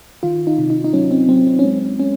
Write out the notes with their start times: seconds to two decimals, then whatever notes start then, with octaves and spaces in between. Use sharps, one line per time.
0.23 D#3 F4
0.47 D#4
0.58 C3
0.70 D#4
0.84 D#4
0.93 F#3 C#4
1.11 C4
1.29 F#3 C4
1.47 C4
1.59 C#4
1.64 G#3 C4
2.00 G#3 C#4